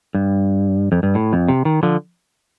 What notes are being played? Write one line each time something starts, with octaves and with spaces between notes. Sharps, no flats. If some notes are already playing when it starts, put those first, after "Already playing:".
G2
F2
G2
A2
F2
C3
D#3
D3 F3